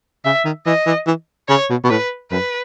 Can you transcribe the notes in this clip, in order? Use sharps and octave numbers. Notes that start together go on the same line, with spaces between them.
C#3 E5
D#3
E3 D#5
E3
E3
C#3 C#5
B2
B2
A2 B4
F#2 B4